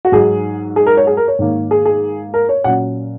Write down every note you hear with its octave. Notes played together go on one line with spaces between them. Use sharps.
F#4
G#2 F#3 D#4 G#4
G#4
A#4
C#5
G#4
A#4
C#5
G#2 D#3 A#3
G#4
G#4
A#4
C#5
A#2 F#3 C#4 F#5